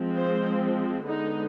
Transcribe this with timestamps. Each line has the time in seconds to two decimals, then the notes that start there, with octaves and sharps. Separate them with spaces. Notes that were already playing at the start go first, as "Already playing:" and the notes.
Already playing: F3 G#3 C4
0.15 C5
1.06 D3 G#3 B3 D#4